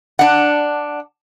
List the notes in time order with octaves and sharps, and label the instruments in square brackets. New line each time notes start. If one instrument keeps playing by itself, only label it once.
[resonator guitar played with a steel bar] D4 F#5